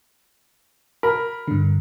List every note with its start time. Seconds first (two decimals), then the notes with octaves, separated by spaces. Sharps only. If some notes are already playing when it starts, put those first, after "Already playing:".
1.03 A#4 B5
1.48 G2 D3